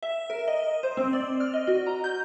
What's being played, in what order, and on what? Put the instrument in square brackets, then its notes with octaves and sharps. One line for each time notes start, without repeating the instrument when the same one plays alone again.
[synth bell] E5
A#4
D#5
C5
C4
D5
F6
D#5
F#4
A#5
G6